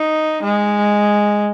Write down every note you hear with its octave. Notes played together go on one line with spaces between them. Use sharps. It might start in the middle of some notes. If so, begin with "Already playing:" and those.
Already playing: D#4
G#3